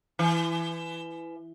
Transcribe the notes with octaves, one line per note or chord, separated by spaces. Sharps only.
E3